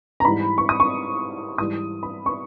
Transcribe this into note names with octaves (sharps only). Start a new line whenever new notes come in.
A#5
G#2 E3 G3 B5
C#6
D#6
C#6
G#2 E3 G3 D#6
B5
C#6